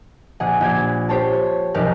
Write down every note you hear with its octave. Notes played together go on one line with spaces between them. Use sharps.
A#1 G#4 F#5
A#1 G4 G#6
G4 C5 C#5 A5
C#5
F1 B1 G4 A#4 F#6